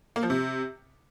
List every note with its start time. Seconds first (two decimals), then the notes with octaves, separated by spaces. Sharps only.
0.16 A#3
0.23 F3
0.30 C3